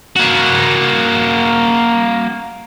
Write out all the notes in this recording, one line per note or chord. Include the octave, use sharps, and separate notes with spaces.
A#3 F#4